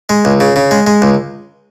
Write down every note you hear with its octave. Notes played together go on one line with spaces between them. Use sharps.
G#3
C#2
C#3
C#3
G#3
G#3
C#2